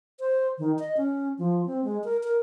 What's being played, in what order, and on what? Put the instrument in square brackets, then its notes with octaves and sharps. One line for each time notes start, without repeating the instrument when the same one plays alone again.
[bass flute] C5
D#3
D#5
C#4
F3
C4
G#3
A#4
A#4